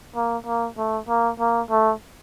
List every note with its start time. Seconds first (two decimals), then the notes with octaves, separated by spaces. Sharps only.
0.16 A#3
0.47 A#3
0.78 A3
1.09 A#3
1.40 A#3
1.71 A3